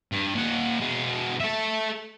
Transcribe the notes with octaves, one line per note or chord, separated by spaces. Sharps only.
G2
A#2 F#5
B2 G#4
A4 E5